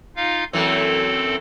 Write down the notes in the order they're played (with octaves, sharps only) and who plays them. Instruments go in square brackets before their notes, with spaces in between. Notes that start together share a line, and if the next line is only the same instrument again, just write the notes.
[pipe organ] D#4 F4 F5
[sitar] F#2 E3 A3 [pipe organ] C4 A4